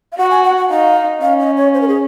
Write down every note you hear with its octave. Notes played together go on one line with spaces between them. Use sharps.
F5
F#4 F#5
G#5
F#5
F#5
D#4 F5
C#4 F5
D#5
C#5
C5
A#4
G#4